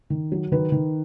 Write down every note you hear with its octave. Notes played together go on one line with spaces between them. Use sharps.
D#3
F#3
D#3 B4
D#3